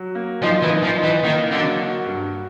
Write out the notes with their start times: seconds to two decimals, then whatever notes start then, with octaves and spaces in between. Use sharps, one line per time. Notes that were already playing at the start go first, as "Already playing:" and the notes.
Already playing: F#3
0.15 A#3
0.42 F3 D#4
0.62 E3
0.69 D#4
0.83 F3
0.97 D#4
1.03 E3
1.24 D#3 A#3
1.52 D3 F#3
1.79 F#4
2.06 G2